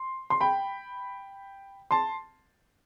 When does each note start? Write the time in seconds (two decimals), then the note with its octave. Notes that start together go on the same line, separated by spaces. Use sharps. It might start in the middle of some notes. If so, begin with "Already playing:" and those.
Already playing: C6
0.30 C6
0.41 G5 B5
1.91 A5 C6